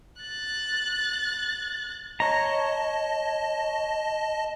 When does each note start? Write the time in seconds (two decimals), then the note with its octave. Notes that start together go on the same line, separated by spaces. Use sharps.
0.22 F#6 A6
2.20 C#5 D#5 A5 A#5